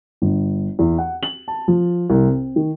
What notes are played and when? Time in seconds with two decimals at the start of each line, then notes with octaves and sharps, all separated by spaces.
0.22 G1
0.79 E2
0.98 F#5
1.23 F#7
1.48 A5
1.68 F3
2.10 C2
2.26 C4
2.56 D#3